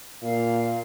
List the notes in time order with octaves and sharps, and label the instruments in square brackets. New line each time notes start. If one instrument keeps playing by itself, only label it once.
[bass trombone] A#2 [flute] F5